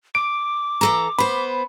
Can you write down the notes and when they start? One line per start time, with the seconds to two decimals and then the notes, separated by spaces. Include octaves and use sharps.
0.15 D6 D7
0.81 E3 A4 A#5
1.18 B3 C5 B5